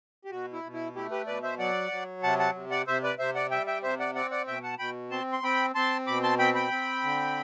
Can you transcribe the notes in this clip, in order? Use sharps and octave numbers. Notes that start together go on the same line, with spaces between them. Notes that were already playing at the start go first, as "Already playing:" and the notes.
G4
B2 F#4
E4
B2
E4
A3 E4 G4
G4 B4
B2 B4 D5
C5 E5
F#3 D5 F#5
F#3
C3 F#5 A5
F#5 A5
C3
D5 F#5
C3 C5 E5
B4 D5
C3 C5 E5
D5 F#5
G3 E5 G5
E5 G5
C3 C5 E5
D5 F#5
C4 D5 F#5
D5 F#5
B2 E5 G5
F#5 A5
B2 G5 B5
C4 A5 C6
C6
C4 G5 B5
C4 A5 C6
B2 B5 D6
A5 C6
C4 G5 B5
G5 B5
C4
D3